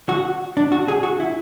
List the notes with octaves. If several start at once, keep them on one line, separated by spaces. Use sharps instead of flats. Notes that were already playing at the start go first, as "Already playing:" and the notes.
F#4
D4
F#4
G#4
F#4
E4